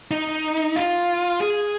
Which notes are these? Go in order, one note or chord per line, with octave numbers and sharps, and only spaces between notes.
D#4
F4
G#4